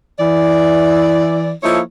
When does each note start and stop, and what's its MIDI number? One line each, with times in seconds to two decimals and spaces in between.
0.20 1.51 52
0.20 1.51 74
1.63 1.79 53
1.63 1.79 58
1.63 1.79 64
1.63 1.79 69
1.63 1.79 73
1.63 1.79 75